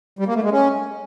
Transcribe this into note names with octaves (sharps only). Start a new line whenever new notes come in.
G3
A#3
A3
G#3
C#4